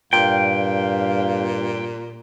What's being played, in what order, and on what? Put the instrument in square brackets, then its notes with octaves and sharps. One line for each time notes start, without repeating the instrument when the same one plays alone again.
[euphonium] G2 [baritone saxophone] A#2 [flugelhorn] F5 [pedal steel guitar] G5